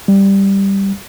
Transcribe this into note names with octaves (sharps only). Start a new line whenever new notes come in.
G3